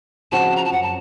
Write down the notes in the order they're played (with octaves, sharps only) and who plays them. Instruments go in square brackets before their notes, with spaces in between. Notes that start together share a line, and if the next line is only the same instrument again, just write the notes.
[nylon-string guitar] C#3 F3 C4 F#4 [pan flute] A5
[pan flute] A#5
A5
[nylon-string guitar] F#2 [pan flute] F#5
[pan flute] A5